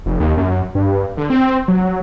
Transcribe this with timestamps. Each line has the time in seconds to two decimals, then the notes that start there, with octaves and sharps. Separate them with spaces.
0.06 F1
0.20 D#2
0.37 F#2
0.75 G2
1.17 D3
1.30 C4
1.68 F#3